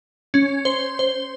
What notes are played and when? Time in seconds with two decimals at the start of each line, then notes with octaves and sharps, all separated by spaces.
0.34 C#4
0.65 C5
0.99 C5